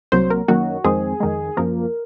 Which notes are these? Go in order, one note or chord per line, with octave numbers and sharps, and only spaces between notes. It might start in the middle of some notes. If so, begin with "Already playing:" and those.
C2 C3 F#3 A#3 C5
A#4
F#2 D#3 F#3 A#3 F#4
F2 D#3 G#3 C4 G#4
F2 D#3 G#3
F#2 F3 A#3 A#4